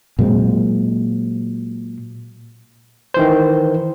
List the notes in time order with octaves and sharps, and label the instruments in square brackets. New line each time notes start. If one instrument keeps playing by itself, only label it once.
[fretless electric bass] A#2 F#3 G#3 C4
[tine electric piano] D#3 E3 C5